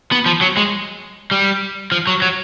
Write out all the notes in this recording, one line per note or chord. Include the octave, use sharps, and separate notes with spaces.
B3
F3
F#3
G#3
G3
F3
F#3
F#3